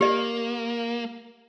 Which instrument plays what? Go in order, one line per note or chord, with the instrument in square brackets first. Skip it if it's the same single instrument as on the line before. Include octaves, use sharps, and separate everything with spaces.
[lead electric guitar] A#3 [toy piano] G4 D#5